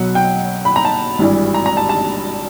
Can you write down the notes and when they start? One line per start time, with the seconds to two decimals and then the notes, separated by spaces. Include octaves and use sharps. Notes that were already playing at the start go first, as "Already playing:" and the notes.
Already playing: B1 B2 F#3 F#5
0.15 G5
0.65 B5
0.76 A#5
0.85 A5
1.19 G#1 G2 E3 G3
1.54 A#5
1.66 A#5
1.77 A5
1.89 A5